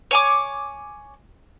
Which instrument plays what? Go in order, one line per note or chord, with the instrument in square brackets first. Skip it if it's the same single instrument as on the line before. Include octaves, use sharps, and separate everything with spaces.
[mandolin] C#5 G#5 D6